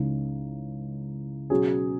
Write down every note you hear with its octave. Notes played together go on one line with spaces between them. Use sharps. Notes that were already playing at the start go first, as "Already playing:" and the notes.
Already playing: C#2 C#3 E3 G#3 D#4
B2 F#3 C#4 G#4